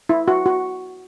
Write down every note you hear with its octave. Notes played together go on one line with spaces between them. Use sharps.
E4
F#4
F#4